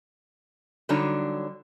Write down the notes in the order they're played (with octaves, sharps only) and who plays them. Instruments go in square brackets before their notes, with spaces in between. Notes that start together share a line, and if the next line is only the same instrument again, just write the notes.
[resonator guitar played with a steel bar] D3 F#3 G3 D4 D#4 C#5